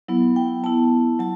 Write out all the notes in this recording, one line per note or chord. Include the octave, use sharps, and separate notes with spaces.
F#3 B3 E4
G5
B3 E4 A5
F#3 A5